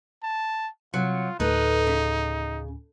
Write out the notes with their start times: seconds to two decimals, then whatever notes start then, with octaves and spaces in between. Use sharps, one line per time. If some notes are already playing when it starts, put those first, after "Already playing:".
0.23 A5
0.94 C3 F#3 F4 C#7
1.40 D2 A2 D#4 A4 B4
1.87 C#3